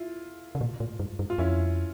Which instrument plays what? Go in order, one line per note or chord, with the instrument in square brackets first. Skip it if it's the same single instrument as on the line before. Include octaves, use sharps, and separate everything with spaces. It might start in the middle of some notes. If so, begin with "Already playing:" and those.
Already playing: [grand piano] E4 F4
[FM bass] C#3
A#2
A2
G2
G2
[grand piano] F4
[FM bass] F2 [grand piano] C#4 E4